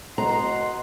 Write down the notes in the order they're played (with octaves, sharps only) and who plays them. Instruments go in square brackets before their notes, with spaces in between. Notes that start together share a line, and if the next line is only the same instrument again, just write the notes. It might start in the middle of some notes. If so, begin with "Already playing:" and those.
[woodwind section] B2 F#5 C6 [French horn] D#5 [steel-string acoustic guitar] A#5